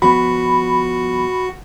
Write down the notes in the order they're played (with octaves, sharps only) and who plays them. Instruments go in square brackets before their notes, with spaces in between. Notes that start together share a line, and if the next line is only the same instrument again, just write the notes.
[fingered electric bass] G1 F3 B3 [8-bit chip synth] F#4 [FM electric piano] B5